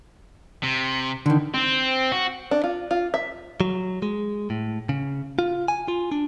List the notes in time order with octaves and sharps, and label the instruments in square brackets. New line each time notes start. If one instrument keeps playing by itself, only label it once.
[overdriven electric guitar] C3
[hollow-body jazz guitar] D3 D#3
[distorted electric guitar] C4
F#4
[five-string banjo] D4
F4
F4
E5
[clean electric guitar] F#3
G#3
A2
C#3
F4
G#5
F4
D4